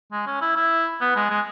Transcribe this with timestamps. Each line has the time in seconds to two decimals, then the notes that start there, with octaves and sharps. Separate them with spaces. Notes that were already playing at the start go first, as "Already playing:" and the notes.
0.12 G#3
0.27 C#4
0.41 E4
0.56 E4
1.01 B3
1.16 G#3
1.30 G#3